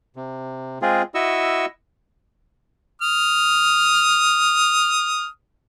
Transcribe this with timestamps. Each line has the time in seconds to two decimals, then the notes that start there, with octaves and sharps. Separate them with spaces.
0.16 C3
0.82 G#3 C4 F4 G#4
1.15 E4 F#4 D#5 C#6 E6
3.02 D#6 F6